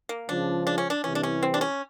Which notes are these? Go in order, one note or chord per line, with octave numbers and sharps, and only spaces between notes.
A#3
C#2 C#3 F3 D4
D4
C#4
D4
C2 C3 E3 C#4
D4
C#4
C4
D4
C#4